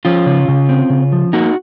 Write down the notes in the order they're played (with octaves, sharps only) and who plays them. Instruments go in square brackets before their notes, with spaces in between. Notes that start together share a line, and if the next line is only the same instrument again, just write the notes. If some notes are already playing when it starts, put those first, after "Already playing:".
[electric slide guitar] F3 C#4 F4
C#3
C#3
C4
C#3
F3
A#3 D#4 F#4